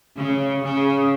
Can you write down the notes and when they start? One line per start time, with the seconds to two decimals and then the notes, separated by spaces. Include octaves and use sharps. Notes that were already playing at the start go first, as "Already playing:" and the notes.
0.17 C#3
0.64 C#3